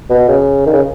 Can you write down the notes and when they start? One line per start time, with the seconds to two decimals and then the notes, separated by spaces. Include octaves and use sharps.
0.10 B2
0.28 C#3
0.66 D#3
0.73 C#3